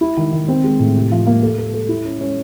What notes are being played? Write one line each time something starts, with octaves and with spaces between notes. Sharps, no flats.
E4
D#3
D#3
C4
G#3
A2
C3
F3
A#3
A4
A4
A4
E4
C#4
C#4